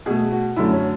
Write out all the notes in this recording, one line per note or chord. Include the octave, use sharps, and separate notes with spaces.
B2 A3 G#4
F#4
F#2 D3 F#3 A3 E4
C#4